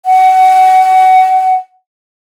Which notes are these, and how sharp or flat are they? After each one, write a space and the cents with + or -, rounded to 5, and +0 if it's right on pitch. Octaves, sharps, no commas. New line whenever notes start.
F#5 +25